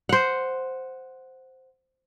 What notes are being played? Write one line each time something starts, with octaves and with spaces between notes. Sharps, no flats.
C5 F#5